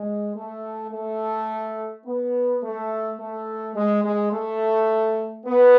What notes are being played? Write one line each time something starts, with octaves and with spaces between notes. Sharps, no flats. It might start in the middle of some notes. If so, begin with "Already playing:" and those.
Already playing: G#3
A3
A3
B3
A3
A3
G#3
G#3
A3
B3